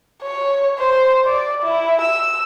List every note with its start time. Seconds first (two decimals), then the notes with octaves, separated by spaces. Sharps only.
0.23 C#5
0.79 C5
1.25 D5
1.63 E4
2.02 E6